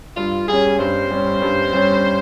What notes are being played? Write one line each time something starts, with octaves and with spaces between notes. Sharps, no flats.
G2 F4
G3 C#4 G#4
G2 C5
G3 C#4
G2
G3 C#4